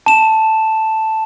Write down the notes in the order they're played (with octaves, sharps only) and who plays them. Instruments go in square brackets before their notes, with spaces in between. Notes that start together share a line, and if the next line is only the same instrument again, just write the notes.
[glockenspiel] A5 E7